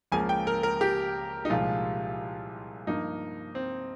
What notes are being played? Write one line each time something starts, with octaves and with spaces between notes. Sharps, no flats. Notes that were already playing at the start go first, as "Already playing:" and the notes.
C#2 C#3 F3 A#3 G#5
G5
A#4
A#4
G4
D#4
C2 A#2 F3 G#3 F4
G2 F3 A#3 D#4
C4